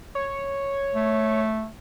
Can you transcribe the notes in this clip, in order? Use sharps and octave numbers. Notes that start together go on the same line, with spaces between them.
C#5
A3